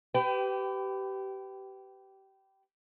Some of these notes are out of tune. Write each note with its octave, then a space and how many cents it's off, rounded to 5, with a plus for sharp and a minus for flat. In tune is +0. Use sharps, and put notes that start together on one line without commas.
G4 -20 B4 +25 G5 +0